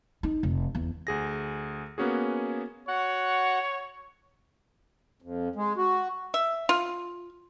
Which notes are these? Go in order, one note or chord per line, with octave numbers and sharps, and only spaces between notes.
D#4
F1
E2
D2 G#4 A#6
A#3 B3 C#4 F#4 G#4
F#4 C#5 F#5 F#6
F2
G#3
F#4
E5
F4